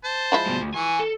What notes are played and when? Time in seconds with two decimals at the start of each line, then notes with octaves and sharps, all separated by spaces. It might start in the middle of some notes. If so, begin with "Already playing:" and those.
0.04 C5 A5
0.32 F3 G#3 E4
0.46 G2 B2
0.60 D2
0.74 E3 G#5 C#6
1.00 A4